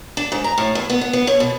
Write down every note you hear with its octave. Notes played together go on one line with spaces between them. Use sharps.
D4
G#2
A#5
A2
E2
B3
B3
B3
C#5
B2